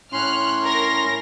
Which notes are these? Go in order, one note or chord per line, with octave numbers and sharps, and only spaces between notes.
A2 C#4 C6 F6 F#6
A#4 A#6